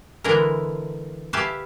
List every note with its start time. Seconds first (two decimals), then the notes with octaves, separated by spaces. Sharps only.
0.24 D3 E3 G#3 D4 E4 A#4
1.33 G4 B4 E5 F5 G#5 A5